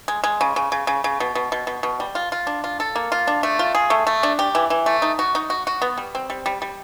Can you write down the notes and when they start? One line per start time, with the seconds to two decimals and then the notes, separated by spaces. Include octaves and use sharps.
0.08 G#3
0.24 G#3
0.41 C#3
0.56 C#3
0.72 C#3
0.87 C#3
1.04 C#3
1.20 B2
1.35 B2
1.52 B2
1.67 B2
1.83 B2
2.00 G3
2.15 F4
2.32 F4
2.47 D4
2.64 F4
2.80 A4
2.96 A#3
3.12 F4
3.27 D4
3.43 A3
3.59 F4
3.75 G#4
3.90 A3
4.07 A3
4.23 D4
4.39 G4
4.55 E3
4.70 E3
4.86 A3
5.02 D#4
5.19 F#4
5.35 D#4
5.50 F#4
5.67 F#4
5.82 B3
5.98 G3
6.15 C4
6.30 G3
6.46 G3
6.62 G3